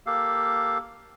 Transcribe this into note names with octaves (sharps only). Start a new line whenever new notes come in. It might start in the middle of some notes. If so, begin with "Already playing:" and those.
A#3 G4 A4 F5